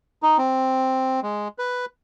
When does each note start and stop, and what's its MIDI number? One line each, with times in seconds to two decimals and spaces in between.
0.23 0.37 63
0.38 1.20 60
1.23 1.48 56
1.58 1.85 71